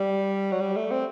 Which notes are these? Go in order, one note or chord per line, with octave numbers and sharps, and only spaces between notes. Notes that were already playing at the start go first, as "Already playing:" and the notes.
Already playing: G3
F#3
G3
A3
C4